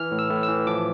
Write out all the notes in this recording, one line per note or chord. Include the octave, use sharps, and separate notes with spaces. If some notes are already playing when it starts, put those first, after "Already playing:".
Already playing: E3 F6
A2
E6
A2
E6
E3
F3 D6